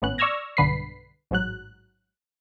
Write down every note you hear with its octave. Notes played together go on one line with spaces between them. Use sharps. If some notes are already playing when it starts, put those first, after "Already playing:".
G#1 A2 B3 C#4 F#6
D5 C#6 E6 F6 G#6 A#6
B1 G2 D3 B4 B6 C7
A1 G#2 F#3 F#6